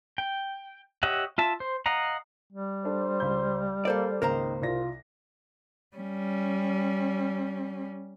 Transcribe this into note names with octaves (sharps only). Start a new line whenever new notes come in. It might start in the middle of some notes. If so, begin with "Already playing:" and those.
G5
G4 C#5 D#5 E5 F#5
F4 E5 A5
C5
D#5 F5 F#5 A#5
G3
D4 A4 C5
C#2 B5 G6
A#3 A4 C5 D5 D6
G#1 C#2 D#3 A#3 A#4 C5 A#5
C2 F4 D5 A#6
G3 C#4